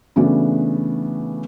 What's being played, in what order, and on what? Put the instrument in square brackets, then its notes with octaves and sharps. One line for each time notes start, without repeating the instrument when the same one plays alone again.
[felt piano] C#3 E3 A3 B3 D4 F#4